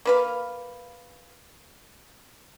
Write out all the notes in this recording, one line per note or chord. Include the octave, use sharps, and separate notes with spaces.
A#3 B4 F5